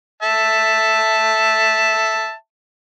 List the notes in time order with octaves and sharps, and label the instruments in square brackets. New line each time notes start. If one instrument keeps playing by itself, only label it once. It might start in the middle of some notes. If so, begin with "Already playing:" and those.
[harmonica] E5 A5